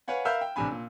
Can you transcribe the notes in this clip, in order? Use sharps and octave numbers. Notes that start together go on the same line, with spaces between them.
B4 C#5 F5 F#5 G#5
A#4 E5 F5 B5 E6 G6
G5
A1 C3 D4 G#5 B5
A#2